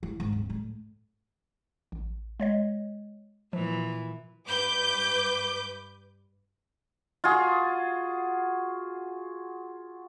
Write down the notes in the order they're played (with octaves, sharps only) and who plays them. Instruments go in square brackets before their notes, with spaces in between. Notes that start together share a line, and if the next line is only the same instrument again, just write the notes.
[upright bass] E3
G#2
D1
A2
[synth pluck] A1
G#3 C#5 D#5
[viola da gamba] A#2 E3 [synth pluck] F3
[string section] G2 B4 D6 G6
[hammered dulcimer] F4 F#4 G#4